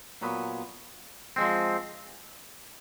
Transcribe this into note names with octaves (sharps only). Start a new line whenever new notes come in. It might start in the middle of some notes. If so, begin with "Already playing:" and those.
A#2 F#3 B3
F3 G#3 C4